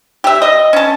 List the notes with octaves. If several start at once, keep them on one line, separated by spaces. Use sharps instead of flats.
G4 E5
D#5
C#4 A5